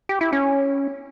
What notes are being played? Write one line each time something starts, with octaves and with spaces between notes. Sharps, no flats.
G4
E4
C#4